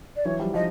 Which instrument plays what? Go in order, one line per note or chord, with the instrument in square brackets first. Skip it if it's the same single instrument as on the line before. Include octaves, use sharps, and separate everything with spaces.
[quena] D5
[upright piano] E3 F#3 [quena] C#5
[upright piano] F3 G3
[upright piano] F3 G3 [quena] D#5